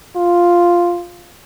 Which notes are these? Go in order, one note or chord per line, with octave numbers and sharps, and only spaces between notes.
F4